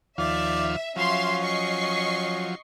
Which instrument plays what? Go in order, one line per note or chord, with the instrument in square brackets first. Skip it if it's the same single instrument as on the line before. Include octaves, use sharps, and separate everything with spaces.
[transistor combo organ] D#2 F3 F5 [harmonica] D5 [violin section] E5
[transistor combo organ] F3 F#3 [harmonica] C#4 [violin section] E5 F5 C6
[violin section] D#5 C#6 C7